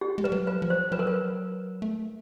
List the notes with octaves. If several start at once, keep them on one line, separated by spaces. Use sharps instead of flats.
G4
G#3
G3 B4
F#3
B4
F3
C5
F#3 B4
A#4
B4
A3